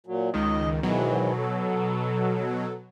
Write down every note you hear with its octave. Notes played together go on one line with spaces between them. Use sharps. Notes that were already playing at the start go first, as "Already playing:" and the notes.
A#2 F#3
C#2 D#3 D#5
G#2 B2 D#3 E3 F#3
A4